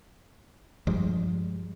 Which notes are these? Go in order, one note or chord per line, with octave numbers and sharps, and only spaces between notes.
G2 F3 G3 G#3